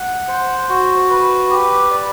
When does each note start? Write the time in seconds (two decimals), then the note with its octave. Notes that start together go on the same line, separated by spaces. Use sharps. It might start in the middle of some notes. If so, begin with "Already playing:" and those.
Already playing: F#5
0.28 C5
0.69 F#4
1.10 B4
1.50 G4
1.91 D5